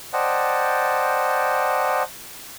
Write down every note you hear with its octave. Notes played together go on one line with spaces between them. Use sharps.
C5 D5 D#5 F#5 G5 A5